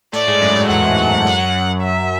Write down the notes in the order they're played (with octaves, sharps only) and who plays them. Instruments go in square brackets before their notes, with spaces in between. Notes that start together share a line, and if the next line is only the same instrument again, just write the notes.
[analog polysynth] A2 A3 [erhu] D5
[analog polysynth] G#2 G#3
F#2 F#3
F#2 F#3
[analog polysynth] E2 E3 [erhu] F#5
[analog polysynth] E2 E3
F#2 F#3
[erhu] E5